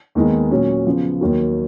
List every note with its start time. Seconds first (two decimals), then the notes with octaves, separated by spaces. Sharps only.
0.15 D#2 D#3 G#3 B3 D#4
0.51 A#2 F#3 C#4
0.86 C#3 F3 B3
1.21 D#2 D#3 F#3